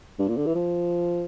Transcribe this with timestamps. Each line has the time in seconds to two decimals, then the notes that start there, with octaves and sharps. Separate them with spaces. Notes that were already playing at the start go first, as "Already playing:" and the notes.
0.19 G2
0.28 A#2
0.37 D3
0.46 E3
0.55 F3